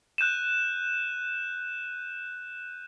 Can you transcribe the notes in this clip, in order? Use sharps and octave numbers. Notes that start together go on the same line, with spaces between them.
F#6 G6 D#7 E7